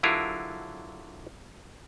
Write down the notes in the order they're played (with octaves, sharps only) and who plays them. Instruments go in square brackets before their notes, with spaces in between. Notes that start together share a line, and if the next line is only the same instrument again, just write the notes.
[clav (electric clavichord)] D3 F#3 E4 F4 G#4 A#4